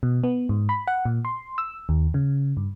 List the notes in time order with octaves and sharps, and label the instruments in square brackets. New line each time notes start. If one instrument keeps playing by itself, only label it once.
[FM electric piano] B2
B3
G#2
B5
F#5
A#2
C6
E6
D#2
C#3
G2